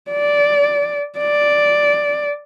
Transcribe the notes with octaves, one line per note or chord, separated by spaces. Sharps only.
D5
D5